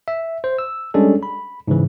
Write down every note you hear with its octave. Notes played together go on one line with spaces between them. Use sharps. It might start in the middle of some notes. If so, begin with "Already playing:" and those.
E5
C5
E6
G3 G#3 C#4 D4 A4
B5
G#2 C#3 E3